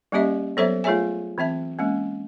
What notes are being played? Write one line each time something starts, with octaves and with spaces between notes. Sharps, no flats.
G3 A#3 C#4 G4 D#5 E5
F#3 B3 A4 C5 C#5 E5
A3 F4 G#4 C#5 E5 G#5
E3 C4 E5 A5
G#3 A#3 C#4